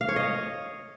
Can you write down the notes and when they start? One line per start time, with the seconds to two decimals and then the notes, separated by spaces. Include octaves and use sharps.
0.01 F5
0.09 C#5
0.16 D#5